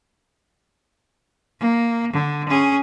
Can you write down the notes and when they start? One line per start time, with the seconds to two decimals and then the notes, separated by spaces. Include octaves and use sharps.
1.60 A#3
2.13 D3
2.49 C#4 G#4